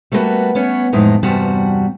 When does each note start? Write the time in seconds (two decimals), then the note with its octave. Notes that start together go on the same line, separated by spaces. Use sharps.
0.12 G3 A3 A#3 E4 F#4 B4
0.55 B3 C#4 C#5
0.93 F2 A2 E3 G#3 D#4
1.23 E2 G2 C3 G3 F#4 A5